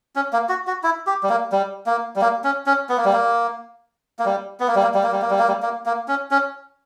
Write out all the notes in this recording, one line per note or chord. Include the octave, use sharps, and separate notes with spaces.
C#4
A#3
F#4
F#4
E4
G4
G3
A#3
G3
A#3
G3
A#3
C#4
C#4
B3
A#3
G3
A#3
A#3
G3
B3
A#3
G3
A#3
G3
A#3
G3
A#3
G3
A#3
G3
A#3
A#3
C#4
C#4